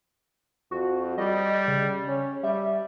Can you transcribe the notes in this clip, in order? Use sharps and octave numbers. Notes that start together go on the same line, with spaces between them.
F2 F#4
G3 D#5
C#3
C#4
G3 E5